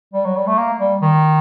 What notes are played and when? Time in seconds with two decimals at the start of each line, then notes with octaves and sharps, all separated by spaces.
0.13 G3
0.25 F#3
0.36 G3
0.47 A3
0.58 A#3
0.80 G3
1.02 D#3